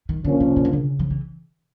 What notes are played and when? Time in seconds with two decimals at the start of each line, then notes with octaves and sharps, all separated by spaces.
0.09 D#3
0.24 A#2 D3 F3 A#3 C#4
0.40 C3
0.56 C#3
0.65 D3
0.73 C#3
0.99 F3
1.10 E3